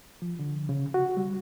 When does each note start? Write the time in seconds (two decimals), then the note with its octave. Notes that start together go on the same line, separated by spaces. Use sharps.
0.22 F3
0.39 D3
0.69 C#3
0.94 F#4
1.17 G3